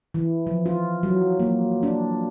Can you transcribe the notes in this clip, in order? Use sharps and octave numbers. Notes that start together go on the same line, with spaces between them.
E3
F3
F4
F#3
A#3
D4